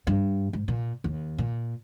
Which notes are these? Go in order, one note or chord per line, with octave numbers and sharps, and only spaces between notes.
G2
G#2
A#2
D#2
A#2